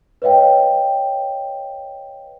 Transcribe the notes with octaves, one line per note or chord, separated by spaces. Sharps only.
B4 C#5 D#5 F5 G5